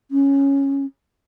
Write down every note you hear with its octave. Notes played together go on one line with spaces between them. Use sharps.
C#4